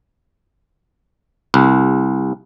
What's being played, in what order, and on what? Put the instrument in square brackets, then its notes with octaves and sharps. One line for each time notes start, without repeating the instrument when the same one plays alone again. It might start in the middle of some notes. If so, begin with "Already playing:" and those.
[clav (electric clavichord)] C2